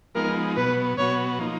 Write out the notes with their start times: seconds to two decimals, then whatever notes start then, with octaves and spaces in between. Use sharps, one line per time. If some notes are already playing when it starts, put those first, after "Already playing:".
0.15 F3 G#3 B3 D#4 A#4
0.56 B2 F#3 B3 B4
0.98 B2 F#3 B3 F#4 C#5
1.39 F3 A#3 D#4